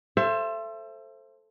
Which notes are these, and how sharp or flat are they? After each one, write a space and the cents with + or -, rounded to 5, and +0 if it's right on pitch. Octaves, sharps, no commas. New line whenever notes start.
A4 +0 C5 +15 E5 +35